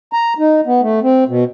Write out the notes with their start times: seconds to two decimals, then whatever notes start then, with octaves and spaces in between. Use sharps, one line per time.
0.13 A#5
0.38 D#4
0.66 B3
0.81 A3
1.03 C4
1.28 B2